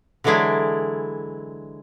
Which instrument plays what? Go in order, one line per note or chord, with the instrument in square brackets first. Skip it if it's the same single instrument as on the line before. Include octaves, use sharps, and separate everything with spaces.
[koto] D3 E3 F#3 G#3 D4 E4